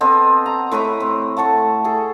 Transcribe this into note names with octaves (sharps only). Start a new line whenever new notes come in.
B3 C4 A4 D#5
A#5
A2 B4 A#5 B5
C4
A3 F#5 A5 C#6
G#4 A4